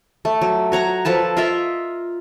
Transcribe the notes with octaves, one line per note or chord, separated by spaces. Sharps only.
A3
F#3
F#4 C#5 A#5
F3 A4 B4 A5
F4 A#4 D#5 E5